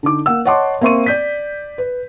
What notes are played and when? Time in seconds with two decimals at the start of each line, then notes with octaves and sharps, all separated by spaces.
0.03 D3 D#4 D6
0.26 A#3 F#5 E6
0.45 C#5 D#5 F#5 A5 C6 D6
0.81 A#3 C4 E5 C6 C#6 D#7
1.06 D5 G6 B6
1.78 B4